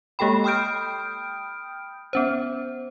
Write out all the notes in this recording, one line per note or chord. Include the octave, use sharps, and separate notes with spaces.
G#3 A#3 G4 A4 G5 B5
G5 B5 D#6 F6 G6 D7
B3 C#4 C5